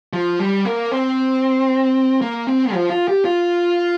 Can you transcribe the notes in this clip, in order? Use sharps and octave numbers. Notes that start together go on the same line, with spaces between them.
F3
G3
A#3
C4
A#3
C4
F3
F4
G4
F4